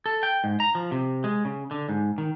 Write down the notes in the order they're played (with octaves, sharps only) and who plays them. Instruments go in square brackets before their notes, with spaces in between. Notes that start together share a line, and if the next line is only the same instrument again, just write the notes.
[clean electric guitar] A4
G5
G#2
A#5
F3
C3
G#3
C#3
D3
G#2
D#3